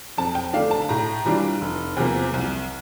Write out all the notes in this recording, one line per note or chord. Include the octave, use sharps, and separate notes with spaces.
F2 A5
G5
D3 A3 D4 F5
A5
A2 A#5
E3 G3 D4 F4
F1
E2 C3 F3 A#3
C2